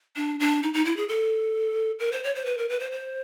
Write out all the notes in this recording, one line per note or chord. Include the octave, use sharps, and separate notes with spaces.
D4
D4
D#4
D#4
E4
G#4
A4
A#4
C5
C#5
C5
B4
A#4
B4
C5
C5